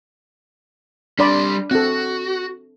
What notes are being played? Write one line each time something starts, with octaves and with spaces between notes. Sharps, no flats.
G3 D4 D5 B5 C6
C4 F#4 A4